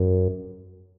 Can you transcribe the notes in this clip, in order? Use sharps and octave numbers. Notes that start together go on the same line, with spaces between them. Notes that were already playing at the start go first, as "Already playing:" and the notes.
Already playing: F#2